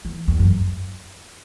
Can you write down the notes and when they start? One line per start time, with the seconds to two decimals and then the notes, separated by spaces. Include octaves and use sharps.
0.05 E3
0.28 E2
0.39 F#2